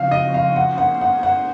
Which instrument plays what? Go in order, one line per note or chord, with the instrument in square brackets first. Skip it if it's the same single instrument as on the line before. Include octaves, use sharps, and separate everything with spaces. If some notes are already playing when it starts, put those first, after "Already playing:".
Already playing: [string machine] C#3 F3 C4 F#4 [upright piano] F5
[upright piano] D#5
F5
[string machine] A#3 C#4 G#4 C5 [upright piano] F#5
[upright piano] F#5
F#5
F#5